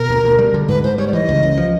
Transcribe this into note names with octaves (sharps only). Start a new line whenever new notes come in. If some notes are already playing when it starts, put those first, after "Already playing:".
Already playing: B2 A#4
D2
D2
G3
D3
G#2 B4
G#2 C5
G3 C#5
D5
E3 D#5
C#2
C#2
F3